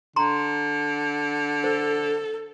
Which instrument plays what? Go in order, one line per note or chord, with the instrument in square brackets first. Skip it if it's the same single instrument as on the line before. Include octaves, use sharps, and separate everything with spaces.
[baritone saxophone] D3 [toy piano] A#5 C6
[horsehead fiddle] A4 [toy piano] C5